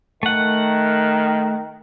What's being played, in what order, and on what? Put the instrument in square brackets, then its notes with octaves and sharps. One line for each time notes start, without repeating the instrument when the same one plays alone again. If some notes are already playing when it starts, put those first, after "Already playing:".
[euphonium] D#3 [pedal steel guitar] A3 F#5